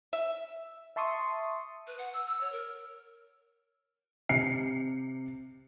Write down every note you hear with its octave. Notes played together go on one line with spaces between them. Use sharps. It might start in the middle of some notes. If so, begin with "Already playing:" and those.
E5
E5 A5 C6 C#6 D#6
B4
F#5
E6
E6
C#5
A#4
C3 C7 C#7